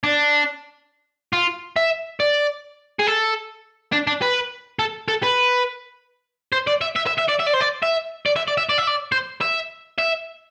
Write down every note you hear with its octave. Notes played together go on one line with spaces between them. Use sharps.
D4
F4
E5
D5
G#4
A4
D4
D4
B4
A4
A4
B4
C5
D5
E5
E5
E5
E5
D5
E5
D5
C5
D5
E5
D5
E5
D5
E5
D5
E5
D5
C5
E5
E5